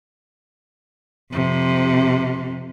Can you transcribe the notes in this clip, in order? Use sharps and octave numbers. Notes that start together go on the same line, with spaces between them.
F2 C3